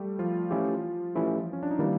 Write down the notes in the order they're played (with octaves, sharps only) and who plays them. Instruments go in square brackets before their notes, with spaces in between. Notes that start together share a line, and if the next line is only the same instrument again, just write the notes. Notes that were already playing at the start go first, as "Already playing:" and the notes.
Already playing: [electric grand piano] G3 A3 G4
F3 F4
[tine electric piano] E3 A3 C#4 E4 G4
E3 A3 C#4 E4 G4
[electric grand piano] C#4
D4
D#4
[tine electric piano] D#3 G3 A#3 [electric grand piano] E3 E4